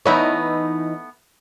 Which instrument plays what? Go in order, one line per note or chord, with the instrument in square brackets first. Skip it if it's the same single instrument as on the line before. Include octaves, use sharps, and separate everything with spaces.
[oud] E3 D#4 C#5 [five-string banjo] A3 B3 E4